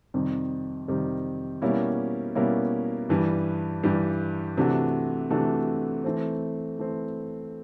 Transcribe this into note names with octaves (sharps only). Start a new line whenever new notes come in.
F2 C3 D#3 G3
F2 C3 D#3 G3
B2 G3 A#3 C#4 E4
B2 G3 A#3 C#4 E4
G2 E3 G3
G2 E3 G3
C3 E3 A3 D4 F#4
C3 E3 A3 D4 F#4
E3 A3 C4
E3 A3 C4